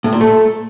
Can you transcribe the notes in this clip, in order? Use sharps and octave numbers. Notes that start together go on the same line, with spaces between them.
A2
A#2
A3